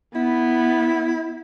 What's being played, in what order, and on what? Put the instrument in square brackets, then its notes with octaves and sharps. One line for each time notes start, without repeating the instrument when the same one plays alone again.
[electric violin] B3 [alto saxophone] E4